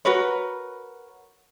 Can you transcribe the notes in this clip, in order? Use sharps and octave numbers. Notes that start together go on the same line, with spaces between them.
F#4 A#4 B4 C#5